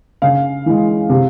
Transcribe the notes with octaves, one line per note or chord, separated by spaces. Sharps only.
C#3 F5
E3 G#3
C3